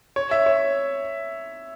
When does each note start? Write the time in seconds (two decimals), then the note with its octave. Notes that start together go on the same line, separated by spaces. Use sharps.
0.16 C#5
0.31 E5
0.46 C#5